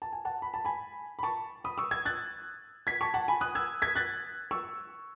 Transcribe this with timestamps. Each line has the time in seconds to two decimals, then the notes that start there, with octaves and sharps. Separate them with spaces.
0.02 A5
0.13 G#5
0.25 F#5 A5
0.42 B5
0.54 A5
0.65 G#5 B5
1.19 B5
1.23 A5 C#6
1.64 B5 D#6
1.78 C#6 E6
1.91 E6 G#6
2.05 F#6 A6
2.87 G#6 B6
3.01 A5 C#6
3.14 F#5 A5
3.28 G#5 B5
3.41 D#6 F#6
3.55 E6 G#6
3.82 G#6 B6
3.95 F#6 A6
4.51 C#6 E6